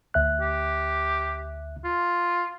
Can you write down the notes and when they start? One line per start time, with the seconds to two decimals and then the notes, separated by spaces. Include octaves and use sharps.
0.14 D2 E5 F#6
0.41 G4
1.84 F4